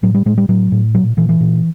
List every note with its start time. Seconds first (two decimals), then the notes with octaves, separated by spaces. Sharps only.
0.03 A2 F#3
0.14 G3
0.26 A2 G#3
0.38 G3
0.49 A2 F#3
0.72 A2
0.94 A#2 F#3
1.17 A#2 E3
1.29 E3
1.40 A#2